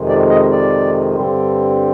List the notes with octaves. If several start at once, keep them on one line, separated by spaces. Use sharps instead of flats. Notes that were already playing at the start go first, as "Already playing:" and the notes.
Already playing: F2 C3 D#3 G#3
D5
D#5
D5
G2 D3 G3 C4